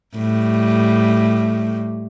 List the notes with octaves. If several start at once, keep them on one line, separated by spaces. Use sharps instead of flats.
A2 G3